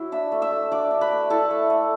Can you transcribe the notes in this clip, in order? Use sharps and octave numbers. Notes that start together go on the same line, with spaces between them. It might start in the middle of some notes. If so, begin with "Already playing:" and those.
Already playing: F#3 E4
D4 E5 E6
A3
E5 E6
A3
D4 D5 D6
D4
B4 B5
A3
E4 A4 A5
A3
A3